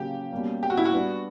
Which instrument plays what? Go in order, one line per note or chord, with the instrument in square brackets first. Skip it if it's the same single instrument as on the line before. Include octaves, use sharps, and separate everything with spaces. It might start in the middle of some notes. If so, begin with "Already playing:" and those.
Already playing: [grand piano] C#3 F#3 A#3 [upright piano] G4
[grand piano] B2 G3 A#3 C#4
[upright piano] G4
F#4
E4
F#4
[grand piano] G3 B3 D4